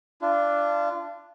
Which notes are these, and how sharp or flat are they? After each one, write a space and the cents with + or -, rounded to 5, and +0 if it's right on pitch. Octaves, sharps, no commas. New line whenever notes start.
D4 +0 F4 -30